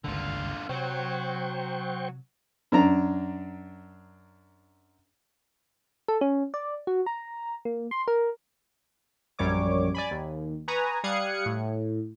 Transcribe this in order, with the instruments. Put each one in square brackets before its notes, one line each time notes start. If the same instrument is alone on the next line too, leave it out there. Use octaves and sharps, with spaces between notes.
[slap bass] G1 C#2 D#3 [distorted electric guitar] D3 F4
[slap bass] C3 [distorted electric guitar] F#3 [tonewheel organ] C5 G5 C#6
[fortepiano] F#2 D4 A#5
[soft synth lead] A4
C#4
D5
F#4
A#5
A#3
C6
A#4
[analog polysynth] A#1 F#2 G3 C#5 D6
D5 G#5 B5
D#2
B4 G#5 A#5 C#6 D#6
G3 F5 D#6 F#6 G#6 C#7
A2